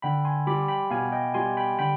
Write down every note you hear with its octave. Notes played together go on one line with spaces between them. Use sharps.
D3 G5 B5
G#5 C6
G3 B5 D6
G5 B5
B2 F5 G#5
D#5 G5
G3 G#5 C6
G5 B5
D3 G5 B5